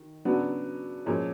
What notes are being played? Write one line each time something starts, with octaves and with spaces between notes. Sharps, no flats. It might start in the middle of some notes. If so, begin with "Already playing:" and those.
Already playing: D#3
C#3 F#3 B3 D4
A#2 F3 G#3 C#4